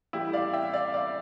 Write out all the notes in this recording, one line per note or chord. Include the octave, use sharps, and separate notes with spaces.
A1 A2 G3 E4 G4
D5 F5
E5 G5
D5 F5
D5 F5